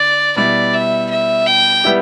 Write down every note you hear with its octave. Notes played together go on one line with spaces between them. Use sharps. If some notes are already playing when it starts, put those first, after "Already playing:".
Already playing: D3 D5
B2 G3 E4 D5
E5
E5
G5
G3 B3 E4 G4